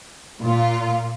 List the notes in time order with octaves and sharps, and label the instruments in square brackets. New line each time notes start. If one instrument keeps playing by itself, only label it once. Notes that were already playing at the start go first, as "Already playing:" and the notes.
[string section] A#2 F4